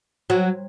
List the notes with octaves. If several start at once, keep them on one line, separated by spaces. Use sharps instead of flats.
F#3